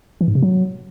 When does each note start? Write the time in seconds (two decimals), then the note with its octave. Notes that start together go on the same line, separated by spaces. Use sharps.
0.21 E3
0.28 G#2
0.35 C3
0.43 F#3